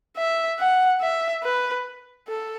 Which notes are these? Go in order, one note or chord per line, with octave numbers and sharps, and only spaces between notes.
E5
F#5
E5
B4
A4